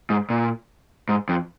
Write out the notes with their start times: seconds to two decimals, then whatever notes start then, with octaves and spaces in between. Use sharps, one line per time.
0.10 G#2
0.30 A#2
1.09 G#2
1.29 F2